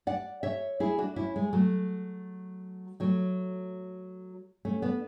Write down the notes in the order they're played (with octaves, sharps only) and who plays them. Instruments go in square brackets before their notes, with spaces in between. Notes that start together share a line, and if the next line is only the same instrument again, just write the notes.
[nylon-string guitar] D5 F#5
C#5 E5
E4 G#4
D4 F#4
C#4 E4
G#3
F#3 A3
F#3 A3
A3 C#4
B3 D4